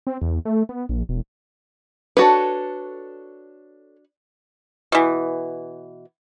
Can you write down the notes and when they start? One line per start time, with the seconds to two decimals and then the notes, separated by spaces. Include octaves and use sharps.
0.07 C4
0.22 E2
0.45 A3
0.69 B3
0.89 A#1
1.09 E1
2.17 D4 F#4 A4 B4 C#5
4.92 B2 E3